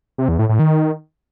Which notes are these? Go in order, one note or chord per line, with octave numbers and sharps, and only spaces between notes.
C3
E2
A2
A2
D#3